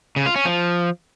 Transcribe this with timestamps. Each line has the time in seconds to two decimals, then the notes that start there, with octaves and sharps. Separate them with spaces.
0.16 C#3
0.26 F4
0.36 C#4
0.45 F3